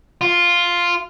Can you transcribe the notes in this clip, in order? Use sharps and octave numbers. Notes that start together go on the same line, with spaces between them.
F4